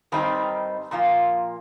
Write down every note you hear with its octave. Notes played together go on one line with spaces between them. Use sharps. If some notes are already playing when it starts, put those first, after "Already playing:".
G2 D#3 G3 C4 D#4
A#2 F3 A#3 F4